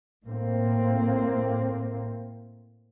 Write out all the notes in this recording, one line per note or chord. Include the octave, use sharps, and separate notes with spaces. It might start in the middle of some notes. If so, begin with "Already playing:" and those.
A2 A#3 C4